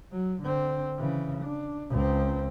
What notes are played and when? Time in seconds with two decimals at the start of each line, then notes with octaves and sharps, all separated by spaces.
0.12 F#3
0.42 D3 C4
0.98 C#3 E3
1.44 D4
1.90 C#2 C4